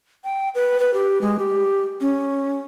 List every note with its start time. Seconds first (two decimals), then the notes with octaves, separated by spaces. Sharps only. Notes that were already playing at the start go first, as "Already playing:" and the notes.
0.24 G5
0.55 B4
0.80 B4
0.94 G4
1.21 G#3
1.39 G4
2.01 C#4